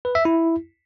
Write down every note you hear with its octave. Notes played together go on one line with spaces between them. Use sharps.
B4
E5
E4